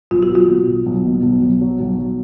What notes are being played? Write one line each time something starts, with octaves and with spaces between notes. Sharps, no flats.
B1 F4
F#4
F#3
F4
B2
B1
B1
B2
B1
B1
F#3
B1
F#3